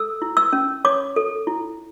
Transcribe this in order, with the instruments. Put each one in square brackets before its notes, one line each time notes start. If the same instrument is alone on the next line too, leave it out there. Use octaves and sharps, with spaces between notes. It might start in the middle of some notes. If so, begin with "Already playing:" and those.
Already playing: [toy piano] A4 E6
E4
E6
C#4
C#5 D6
A4
E4